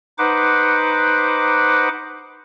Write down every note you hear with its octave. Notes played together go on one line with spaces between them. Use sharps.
D#4 B4 C5 F#5 D6